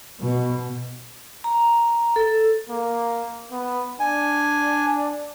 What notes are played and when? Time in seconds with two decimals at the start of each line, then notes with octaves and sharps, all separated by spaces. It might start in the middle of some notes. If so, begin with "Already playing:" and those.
0.21 B2
1.44 A#5
2.16 A4
2.70 A#3
3.52 B3
4.00 D4 G#5